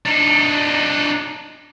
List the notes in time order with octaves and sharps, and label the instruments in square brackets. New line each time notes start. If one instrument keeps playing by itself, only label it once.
[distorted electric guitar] D4 D#4